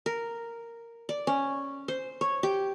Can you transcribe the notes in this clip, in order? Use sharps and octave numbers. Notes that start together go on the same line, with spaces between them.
A#4
D5
C#4
C5
C#5
G4